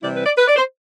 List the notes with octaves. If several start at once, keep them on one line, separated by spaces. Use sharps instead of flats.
C3 E3 G3 C4 E4 D5
B4
D5
B4
D5
C5